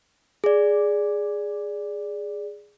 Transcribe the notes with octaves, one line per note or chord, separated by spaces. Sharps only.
G#4 D5